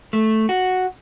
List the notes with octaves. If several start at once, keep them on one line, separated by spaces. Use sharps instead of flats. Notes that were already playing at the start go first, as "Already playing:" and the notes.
A3
F#4